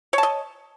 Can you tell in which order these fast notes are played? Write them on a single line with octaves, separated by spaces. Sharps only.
C#5 A5 D#5